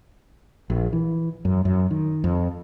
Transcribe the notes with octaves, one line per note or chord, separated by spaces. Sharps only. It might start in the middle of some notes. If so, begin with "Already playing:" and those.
A#1
E3
F#2
F#2
D#3
F2